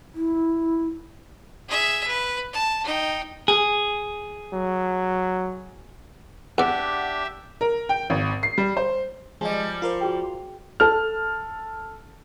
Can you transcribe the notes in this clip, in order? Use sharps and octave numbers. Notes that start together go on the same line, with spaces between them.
E4
G#4 E5
B4
A5
D#4 G5
G#4
F#3
E2 D4 G4 D5 E5 F#5
A#4
G5
G#1
C7
G3
C5
F3 G3 G#3 D5 D#5 G#5
F4 A#4 C5
F#4 G#4 G5
A4 A5 F6